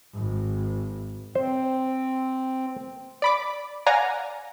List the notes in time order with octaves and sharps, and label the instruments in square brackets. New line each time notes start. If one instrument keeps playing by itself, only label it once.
[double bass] G#1
[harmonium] C4 [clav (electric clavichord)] C5
[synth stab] D5 B5 D6
D5 F5 F#5 G#5 A#5